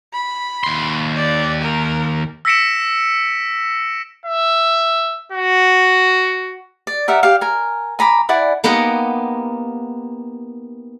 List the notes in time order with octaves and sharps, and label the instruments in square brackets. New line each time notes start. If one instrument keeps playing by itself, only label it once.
[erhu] B5
[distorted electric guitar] D#2 C6
[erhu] D5
A#4
[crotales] E6 A#6 B6 C#7 D7 E7
[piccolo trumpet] E5
F#4
[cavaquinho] D5
G4 A#4 E5 F#5
G4 F5
A#4 G#5
G#5 A#5 B5 D6
E4 D5 F#5 G#5
[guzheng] A#3 B3 D#4 G4 A#4 F#5